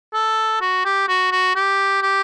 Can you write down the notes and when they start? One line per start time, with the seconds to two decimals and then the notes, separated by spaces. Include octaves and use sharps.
0.14 A4
0.61 F#4
0.85 G4
1.08 F#4
1.32 F#4
1.56 G4
2.02 G4